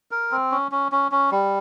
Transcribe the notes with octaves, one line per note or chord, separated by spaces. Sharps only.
A#4
C4
C#4
C#4
C#4
C#4
G3